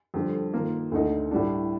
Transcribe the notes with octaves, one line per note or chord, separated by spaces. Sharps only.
F2 D3 G3
D#3 A#3 F4 A#4
D2 D3 A3 D#4
A2 G3 D4